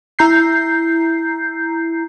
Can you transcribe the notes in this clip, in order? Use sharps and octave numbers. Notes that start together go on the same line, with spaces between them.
E4 A#5 G6 C7